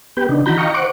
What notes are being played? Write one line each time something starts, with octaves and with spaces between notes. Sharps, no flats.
B3 G4 B4 G5
C#3 D4 D#4
D#3 E3 F#4 A#5 B5 G6
D#5 F5 G5 A#5 C#6
C5 F#5 C#6 D6